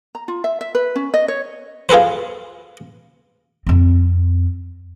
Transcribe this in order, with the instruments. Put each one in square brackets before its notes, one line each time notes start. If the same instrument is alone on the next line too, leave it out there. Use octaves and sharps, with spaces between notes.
[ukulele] A#5
F4
E5
E5
B4
C#4
D#5
C#5
[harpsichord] F4 G#4 A4 B4 C5
[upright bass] F2 C4